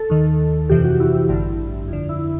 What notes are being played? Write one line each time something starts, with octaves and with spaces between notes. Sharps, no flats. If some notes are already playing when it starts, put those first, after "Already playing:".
Already playing: A4
D#2 D#3
F2 C3 E3 G4
F#4
E4
E4
A1 G2 D3
F2 D3
E4